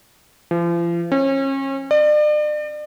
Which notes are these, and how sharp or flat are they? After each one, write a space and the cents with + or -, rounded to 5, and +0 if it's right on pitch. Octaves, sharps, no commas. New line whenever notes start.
F3 -40
C#4 -35
D5 +40